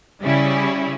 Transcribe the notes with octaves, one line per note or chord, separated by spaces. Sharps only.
C#3 G3 C#4 E4